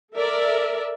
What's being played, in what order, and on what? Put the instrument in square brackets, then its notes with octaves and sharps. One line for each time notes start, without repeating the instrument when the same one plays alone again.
[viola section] A4 A#4 D5 E5